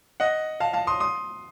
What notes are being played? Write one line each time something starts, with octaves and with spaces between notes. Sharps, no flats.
D#5 F#5
F5 A5
F5 A5
C6 D#6
C6 D#6